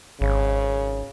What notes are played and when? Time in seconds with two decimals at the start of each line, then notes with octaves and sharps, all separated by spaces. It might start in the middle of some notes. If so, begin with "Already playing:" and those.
0.21 G#1 C#3